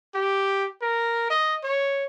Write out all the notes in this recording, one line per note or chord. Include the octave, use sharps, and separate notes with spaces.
G4
A#4
D#5
C#5